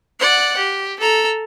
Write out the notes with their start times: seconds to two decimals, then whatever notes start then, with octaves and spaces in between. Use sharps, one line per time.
0.20 D5 F#5
0.57 G4
0.99 A4 A#5